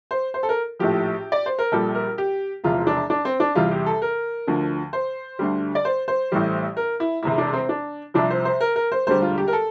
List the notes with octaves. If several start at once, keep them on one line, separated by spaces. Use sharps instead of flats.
C5
C5
A4
A#4
A#1 A2 F3 G4
D5
C5
A#4
A#1 A#2 G3 A4
A#4
G4
E1 E2 C3 F3 F4
D4
D4
C4
D4
E2 C3 E3 G3 F4
G4
A4
A#4
D2 D3 F3
C5
D2 D3 G3
D5
C5
C5
A1 A2 E3 G3
A#4
E4
E1 E2 C3 E4
D4
C4
D4
C2 C3 F3 D4
C5
C5
A#4
A#4
C5
E1 D2 D3 G3 C5
F4
G4
A#4
A4